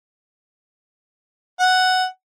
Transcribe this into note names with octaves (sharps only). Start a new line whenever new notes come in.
F#5